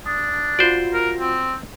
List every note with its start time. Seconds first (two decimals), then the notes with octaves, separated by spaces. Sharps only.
0.06 D4 D#6
0.59 F4 F#4 C5 D5
0.94 A#4
1.19 C4